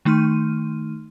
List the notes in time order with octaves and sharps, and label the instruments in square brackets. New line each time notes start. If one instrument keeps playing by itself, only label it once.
[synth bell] D#3 A3 D#4 C6 F6 D#7